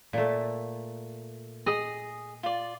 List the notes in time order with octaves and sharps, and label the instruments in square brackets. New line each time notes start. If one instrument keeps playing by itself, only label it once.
[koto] A#2 A3
[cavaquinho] G#4 D#6 [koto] D#5
[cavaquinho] F4 D5